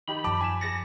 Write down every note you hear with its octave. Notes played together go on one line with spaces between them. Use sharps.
D#3 D#4 G4 B5
F#2 F3 A5 D6
G#5 B6 E7
G#4 A6 A#6 C#7